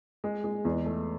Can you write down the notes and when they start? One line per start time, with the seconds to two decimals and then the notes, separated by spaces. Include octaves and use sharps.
0.24 G#3
0.44 G#3
0.65 E2
0.86 A3